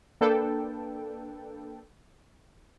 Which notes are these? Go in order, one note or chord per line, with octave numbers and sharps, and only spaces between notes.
A#3 D4 A4 B4 G5